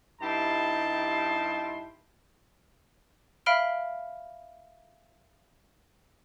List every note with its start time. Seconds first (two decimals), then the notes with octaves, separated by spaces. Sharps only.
0.21 G2 D#4 E4 G4 A5 C6
3.46 E5 F5 B5 F6 D7 G7